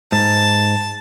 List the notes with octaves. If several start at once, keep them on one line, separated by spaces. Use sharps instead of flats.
G#2 A5